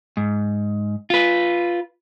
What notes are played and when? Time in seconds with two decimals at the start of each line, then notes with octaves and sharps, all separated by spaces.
0.17 G#2
1.10 F4 B4